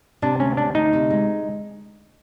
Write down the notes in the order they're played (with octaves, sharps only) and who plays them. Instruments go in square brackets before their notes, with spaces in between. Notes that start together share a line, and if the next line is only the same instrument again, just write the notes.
[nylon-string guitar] C3 [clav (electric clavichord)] D4
[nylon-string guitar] D2 [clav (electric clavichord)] C#4
[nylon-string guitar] D2 [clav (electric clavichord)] D4
[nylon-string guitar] D2 [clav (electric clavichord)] D#4
[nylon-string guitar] C3
G#3